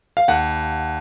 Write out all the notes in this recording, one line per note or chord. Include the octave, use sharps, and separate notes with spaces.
F5
D#2 F#5